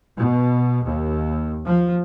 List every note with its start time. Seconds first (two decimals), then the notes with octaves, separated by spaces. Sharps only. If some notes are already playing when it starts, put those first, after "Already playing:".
0.18 B2
0.86 D#2
1.66 F3